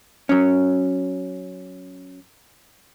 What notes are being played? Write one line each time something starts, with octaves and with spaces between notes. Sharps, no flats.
F#3 C#4